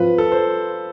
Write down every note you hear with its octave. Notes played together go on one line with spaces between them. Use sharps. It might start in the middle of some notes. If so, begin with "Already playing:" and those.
Already playing: F3 C4 F4 B4
A4
C5